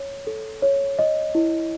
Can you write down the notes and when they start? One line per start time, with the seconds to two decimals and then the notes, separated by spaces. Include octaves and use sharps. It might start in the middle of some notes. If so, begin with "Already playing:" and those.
Already playing: C#5
0.27 A4
0.62 C#5
0.99 D#5
1.35 E4